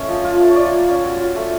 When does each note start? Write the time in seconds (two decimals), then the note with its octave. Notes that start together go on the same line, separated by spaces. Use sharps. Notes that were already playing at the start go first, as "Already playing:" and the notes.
Already playing: A3 C#4 D#5
0.08 F3
0.25 F4
0.40 A3
0.50 C#5
0.56 F4 D5
0.73 A#3
0.88 C#4 D5
1.05 F#3
1.20 F4
1.36 A3